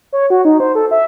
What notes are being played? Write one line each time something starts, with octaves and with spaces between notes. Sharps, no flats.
C#5
F#4
D#4
C5
A4
E5